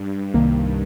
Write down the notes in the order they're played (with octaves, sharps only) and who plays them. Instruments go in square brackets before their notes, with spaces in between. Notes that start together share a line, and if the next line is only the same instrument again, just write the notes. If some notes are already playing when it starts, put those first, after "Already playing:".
Already playing: [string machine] G2
[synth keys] C2 C3 D#3 A#3